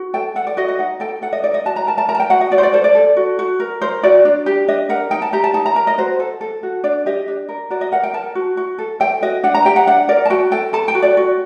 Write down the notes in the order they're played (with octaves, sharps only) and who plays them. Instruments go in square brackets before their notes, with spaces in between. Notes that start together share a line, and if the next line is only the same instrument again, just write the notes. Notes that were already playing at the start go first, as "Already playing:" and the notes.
Already playing: [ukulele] F#4
A4 G5
A4 F#5
D5
F#4 D#5
D#5
D#4 F#5
A4 G5
A4 F#5
D#5
D#4 D5
D#5
F#4 A5
A#5
A#4 A5
A5
A#4 A#5
A5
G5
F#4 F#5
D#5
F#4 D5
C5
D5
A4 C5
D5
A4
F#4
F#4
A#4
A#4 C5
F#4 D5
D4
G4
D4 D#5
A#4 F#5
D#4 G5
A5
G4 A#5
A5
D#4 A5
A#5
A#4 A#5
D#5
F#4 C5
A4
A4
F#4
D4 D5
G4 D#5
D4
A#4
F#4 D5
D#5
A#4 F#5
G5
A#4 A5
F#4
F#4
A4
A4 G5
F#4 D#5
D4 F#5
A#5
G4 G5
F#5
D4 F#5
A#4 D5
A5
F#4 G5
A4 G5
A4 A5
G5
F#4
D5
F#4